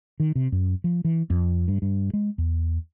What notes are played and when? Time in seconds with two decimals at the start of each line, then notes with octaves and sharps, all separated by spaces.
0.20 D#3
0.35 C3
0.52 F#2
0.84 F3
1.05 E3
1.30 F2
1.68 G2
1.82 G2
2.14 G#3
2.38 E2